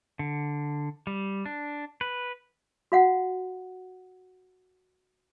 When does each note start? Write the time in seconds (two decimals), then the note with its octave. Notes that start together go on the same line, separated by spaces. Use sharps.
0.19 D3
1.07 G3
1.46 D4
2.01 B4
2.92 F#4 F5 F#5